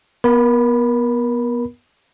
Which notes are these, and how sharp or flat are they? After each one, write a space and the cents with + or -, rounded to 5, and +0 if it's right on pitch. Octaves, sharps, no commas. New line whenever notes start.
B3 -20 A#4 +30 B5 +0